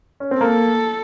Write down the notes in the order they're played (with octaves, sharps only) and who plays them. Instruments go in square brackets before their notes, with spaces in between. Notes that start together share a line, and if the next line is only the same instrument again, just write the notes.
[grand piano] C#4
C4
[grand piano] A#3 [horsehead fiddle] A4